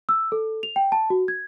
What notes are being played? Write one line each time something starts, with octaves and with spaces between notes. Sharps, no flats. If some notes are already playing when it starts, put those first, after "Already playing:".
E6
A4
F7
G5
A5
F#4
G#6